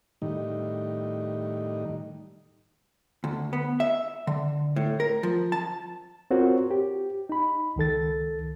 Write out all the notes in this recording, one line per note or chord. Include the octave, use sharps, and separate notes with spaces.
A2 D#3 G3 D#4
D2
B3
E5
D3
A2
A#4
F3
A5
C4 F4 F#4 A#4 C5 C#5
G4
D#4 B5
C#2 D#3 A4 A6